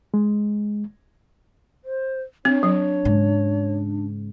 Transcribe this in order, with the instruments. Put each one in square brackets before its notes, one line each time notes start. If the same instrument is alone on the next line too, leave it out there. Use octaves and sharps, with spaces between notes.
[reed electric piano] G#3
[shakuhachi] C5
[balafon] C4 [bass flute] D4 [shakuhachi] C#5
[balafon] F#3
[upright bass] G#2 C#3